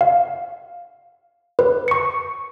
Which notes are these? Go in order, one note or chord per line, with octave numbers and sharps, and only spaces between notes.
F5
B4
C#6 C#7